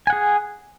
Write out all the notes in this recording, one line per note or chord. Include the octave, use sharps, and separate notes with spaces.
G#4 F#5 G#5